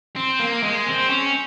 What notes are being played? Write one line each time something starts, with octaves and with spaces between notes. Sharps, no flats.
C4
A#3
G#3
C4
C#4